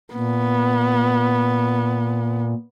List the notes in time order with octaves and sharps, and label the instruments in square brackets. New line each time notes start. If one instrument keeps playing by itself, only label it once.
[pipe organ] A#2 [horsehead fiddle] B3